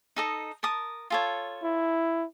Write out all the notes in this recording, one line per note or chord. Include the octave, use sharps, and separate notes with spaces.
D#4 A4 D#5
A#4 A5 D#6
F4 A4 C#5
E4